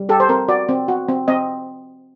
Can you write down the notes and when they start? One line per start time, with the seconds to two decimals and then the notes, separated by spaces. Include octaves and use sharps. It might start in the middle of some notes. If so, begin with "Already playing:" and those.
Already playing: G3
0.09 G4 A4
0.20 C5
0.29 C4 A#4
0.48 F#4 D5
0.69 C4
0.88 F#4
1.09 C4
1.28 C4 D#5